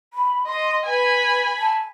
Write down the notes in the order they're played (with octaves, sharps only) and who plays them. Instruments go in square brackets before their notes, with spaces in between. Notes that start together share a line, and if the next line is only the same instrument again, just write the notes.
[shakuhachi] B5
[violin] D#5 [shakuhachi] C6
[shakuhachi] B4 [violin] G#5 B5
[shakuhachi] A5